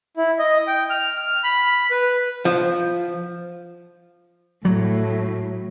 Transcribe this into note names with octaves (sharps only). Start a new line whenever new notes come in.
E4
D#5
G5
F6
F6
B5
B4
F3
A2 F#3